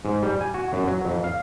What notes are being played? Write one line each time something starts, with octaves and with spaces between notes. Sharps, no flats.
G#2
G3
G#5
F#4
F#2
F#3
F2
F5